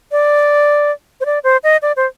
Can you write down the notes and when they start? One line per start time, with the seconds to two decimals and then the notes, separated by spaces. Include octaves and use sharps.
0.12 D5
1.21 C5
1.26 D5
1.44 C5
1.64 D#5
1.82 D5
1.97 C5